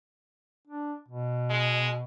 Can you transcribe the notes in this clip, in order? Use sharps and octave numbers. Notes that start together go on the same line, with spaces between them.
D4
B2
G#3